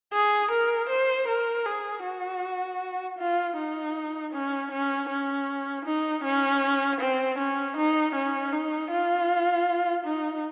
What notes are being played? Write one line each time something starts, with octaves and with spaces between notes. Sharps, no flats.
G#4
A#4
C5
A#4
G#4
F#4
F4
D#4
C#4
C#4
C#4
D#4
C#4
C4
C#4
D#4
C#4
D#4
F4
D#4